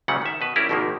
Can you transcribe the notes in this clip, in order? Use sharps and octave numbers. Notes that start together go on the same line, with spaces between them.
D2 A#2 C#3 F#3 G3 F#5
D#3 E5
B2 B4
G3 C#4 E4 G4 A#4 D5
G#1 B2 D#3 F3 A#3